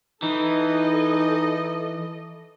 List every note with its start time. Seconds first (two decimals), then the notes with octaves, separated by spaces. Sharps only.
0.23 E3 D#4 A4 D#5